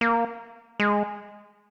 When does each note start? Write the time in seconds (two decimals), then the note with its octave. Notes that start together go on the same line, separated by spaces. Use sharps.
0.01 A#3
0.80 G#3